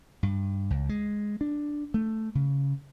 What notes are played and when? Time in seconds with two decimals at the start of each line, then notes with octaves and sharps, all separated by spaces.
0.23 G2
0.70 C#2
0.89 G#3
1.41 D4
1.94 A3
2.35 C#3